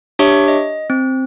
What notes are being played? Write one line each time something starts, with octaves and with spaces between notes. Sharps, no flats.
D4 G4 C#5 E5 C#6
D#5
C4